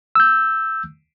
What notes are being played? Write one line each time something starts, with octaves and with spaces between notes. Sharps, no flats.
E6 G6